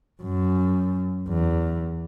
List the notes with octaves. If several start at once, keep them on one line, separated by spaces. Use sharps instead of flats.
F#2
E2